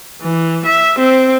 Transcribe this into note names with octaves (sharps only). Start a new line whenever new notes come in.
E3
E5
C4